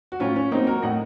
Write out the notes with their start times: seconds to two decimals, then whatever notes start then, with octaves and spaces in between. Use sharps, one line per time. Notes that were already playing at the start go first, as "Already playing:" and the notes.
0.12 F#4
0.20 A2 C#4 F4
0.36 C#4
0.51 F#3 A#3 C4 D#4
0.67 F#4 A#4
0.82 A2 D#5 F#5